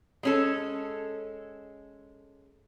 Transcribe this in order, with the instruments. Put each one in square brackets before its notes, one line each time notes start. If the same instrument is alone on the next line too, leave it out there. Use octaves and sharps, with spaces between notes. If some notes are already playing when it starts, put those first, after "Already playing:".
[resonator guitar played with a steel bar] G#3 C#4 A4